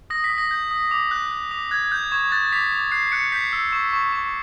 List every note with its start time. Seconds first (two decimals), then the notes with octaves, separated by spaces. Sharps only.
0.10 D#6 A#6
0.24 B6
0.30 D#6
0.38 A#6
0.51 G6
0.71 D#6
0.91 D6
1.11 F#6
1.31 F#6
1.51 D6
1.71 F#6 G#6
1.91 F#6 G6
2.11 C#6 G#6
2.32 F#6 A6
2.52 D6 B6
2.72 D6
2.92 F#6 C7
3.12 F#6 C#7
3.32 G6 B6
3.53 E6
3.73 C#6
3.93 C#6
4.12 C#6